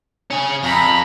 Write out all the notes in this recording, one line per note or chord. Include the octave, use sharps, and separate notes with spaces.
C#4 G#4
F2 A#5 B5